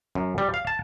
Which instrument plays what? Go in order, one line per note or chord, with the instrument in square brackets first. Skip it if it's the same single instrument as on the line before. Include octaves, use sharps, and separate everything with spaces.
[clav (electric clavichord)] F#2
G3
F5
A5